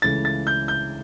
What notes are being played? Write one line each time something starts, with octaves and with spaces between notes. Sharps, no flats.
C#2 C#3 E3 A3 A6
A6
G6
G6